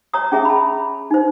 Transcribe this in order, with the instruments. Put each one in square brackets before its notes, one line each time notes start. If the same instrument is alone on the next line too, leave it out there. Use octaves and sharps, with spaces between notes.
[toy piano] C#5 A#5 D#6
C#4 G#4 E5 A#5
A5 B5
D#4 C5